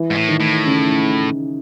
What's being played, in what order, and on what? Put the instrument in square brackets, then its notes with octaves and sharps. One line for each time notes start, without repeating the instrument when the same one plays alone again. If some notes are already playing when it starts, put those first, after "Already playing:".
Already playing: [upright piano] E3
[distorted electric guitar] G#2
A2
[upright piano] D#3
[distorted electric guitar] A2
[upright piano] C#3